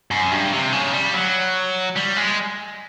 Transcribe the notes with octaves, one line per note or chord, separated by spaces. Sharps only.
F#2
G2
C3
C#3
G3
F#3
G3
G#3